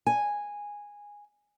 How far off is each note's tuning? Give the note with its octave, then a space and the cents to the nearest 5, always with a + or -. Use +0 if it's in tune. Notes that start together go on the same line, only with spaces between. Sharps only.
G#5 -10